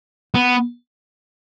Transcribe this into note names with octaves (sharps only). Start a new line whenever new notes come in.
B3